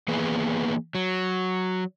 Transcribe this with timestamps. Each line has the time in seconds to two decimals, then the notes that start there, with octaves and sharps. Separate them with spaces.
0.08 E3 A#3 B3 G#4
0.95 F#3